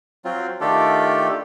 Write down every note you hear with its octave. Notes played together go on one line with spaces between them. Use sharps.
F#3 C4 F4
D#3 A3 D4 F4 G4 A4